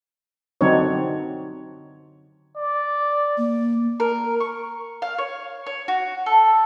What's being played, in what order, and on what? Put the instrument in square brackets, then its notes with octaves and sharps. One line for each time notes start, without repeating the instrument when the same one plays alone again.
[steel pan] D3 F#3 C4 D4 D#4 C#5
[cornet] D5
[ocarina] A#3
[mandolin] A#4
C#6
F5
C#5
C#5
F#4
A4